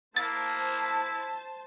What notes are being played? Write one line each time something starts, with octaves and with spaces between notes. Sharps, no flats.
A#3 E4 C5 A5 A6